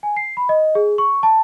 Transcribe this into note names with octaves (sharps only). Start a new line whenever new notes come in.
G#5
C7
B5
D#5
G#4
C#6
A5